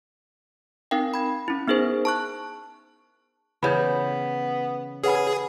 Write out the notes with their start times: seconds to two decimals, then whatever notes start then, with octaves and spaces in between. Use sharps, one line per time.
0.91 C4 D#4 A#4 F5 G5
1.14 B5 G#6
1.48 C#4 E4
1.68 B3 D#4 G#4 A#4 C5
2.05 A5 C#6 F#6
3.63 C#3 E3 B3 B5 G6
5.04 C#4 G#4 B4 F#5 B5